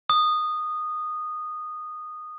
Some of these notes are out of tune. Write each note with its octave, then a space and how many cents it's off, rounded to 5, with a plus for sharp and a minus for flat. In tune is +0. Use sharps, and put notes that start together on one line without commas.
D#6 -15